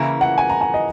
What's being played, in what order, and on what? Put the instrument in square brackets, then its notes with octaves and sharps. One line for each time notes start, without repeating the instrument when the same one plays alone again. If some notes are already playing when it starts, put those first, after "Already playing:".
Already playing: [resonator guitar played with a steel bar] C#3 E3 A#3 E4 [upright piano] A#5
[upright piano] F#5
G#5
A#5
G#5
D#5